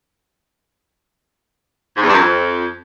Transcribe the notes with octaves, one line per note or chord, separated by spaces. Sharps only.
G#2
E2
G2
F#2
F2